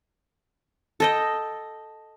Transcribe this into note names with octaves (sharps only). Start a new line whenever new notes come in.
A4 D#5 G5